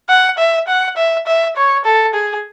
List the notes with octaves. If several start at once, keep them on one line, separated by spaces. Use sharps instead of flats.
F#5
E5
F#5
E5
E5
C#5
A4
G#4